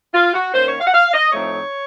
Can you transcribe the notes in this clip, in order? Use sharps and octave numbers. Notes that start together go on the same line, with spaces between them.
F4
F#4
D#3 A#3 C#4 C5
C#5
F5
F#5
F5
D#5
A2 F3 A3 C4 D#4 C#5